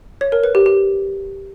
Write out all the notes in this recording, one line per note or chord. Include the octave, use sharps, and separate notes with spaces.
C#5
A#4
B4
G4
G4